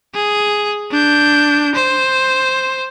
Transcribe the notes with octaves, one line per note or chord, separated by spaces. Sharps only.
G#4
D4 G6
C5